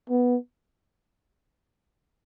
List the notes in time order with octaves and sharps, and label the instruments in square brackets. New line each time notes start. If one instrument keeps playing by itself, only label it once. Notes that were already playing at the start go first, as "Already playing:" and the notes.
[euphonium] B3